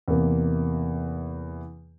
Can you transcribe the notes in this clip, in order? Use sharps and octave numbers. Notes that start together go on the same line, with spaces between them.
E2 C3 A#3